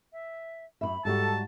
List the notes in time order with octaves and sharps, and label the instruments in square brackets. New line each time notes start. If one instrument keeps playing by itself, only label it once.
[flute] E5
[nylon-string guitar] F#2 C3 E5 [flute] B5
[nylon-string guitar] G#2 G3 F#4 [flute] A4 [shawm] A5